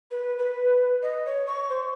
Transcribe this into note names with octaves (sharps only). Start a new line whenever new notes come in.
B4
B4
D#5
C#5
C#6
C5